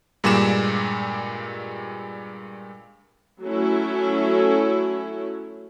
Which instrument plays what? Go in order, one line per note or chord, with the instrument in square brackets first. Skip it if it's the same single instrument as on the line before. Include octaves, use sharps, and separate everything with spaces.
[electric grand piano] G2 A#2 G3 G#3 D6 E7
[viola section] F#3 A3 C#4 E4